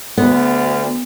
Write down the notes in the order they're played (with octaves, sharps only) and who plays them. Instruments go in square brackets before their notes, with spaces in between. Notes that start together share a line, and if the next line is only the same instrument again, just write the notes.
[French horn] D2 [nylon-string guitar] B3